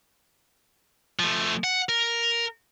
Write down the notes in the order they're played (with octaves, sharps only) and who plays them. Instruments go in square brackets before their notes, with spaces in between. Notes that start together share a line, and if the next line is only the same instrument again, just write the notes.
[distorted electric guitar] F3 A3
F#5
A#4